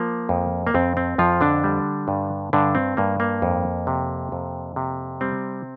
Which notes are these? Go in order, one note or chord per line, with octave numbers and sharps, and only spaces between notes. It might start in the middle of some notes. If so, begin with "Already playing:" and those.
Already playing: F3 A#3
F2
A#3
F2 C4
C4
F2 F3 F4
D3 D4
G3
G2
G2 D3 D4
C4
G2 A#3
A#3
F2
C3
F2
C3
G3 C4